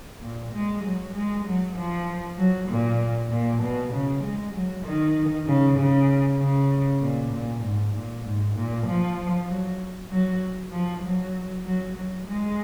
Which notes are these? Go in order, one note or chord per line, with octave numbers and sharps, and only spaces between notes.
A#2
G#3
F#3
G#3
F#3
F3
F#3
A#2
A#2
B2
C#3
G#3
F#3
D#3
C#3
C#3
C#3
A#2
A#2
G#2
A#2
G#2
A#2
F3
F#3
F#3
F3
F#3
F#3
F#3
G#3